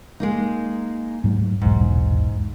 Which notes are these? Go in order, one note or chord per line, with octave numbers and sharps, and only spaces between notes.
G#3 A#3 D#4
G#2 F#3 A3
D#1 B1 E2 G#2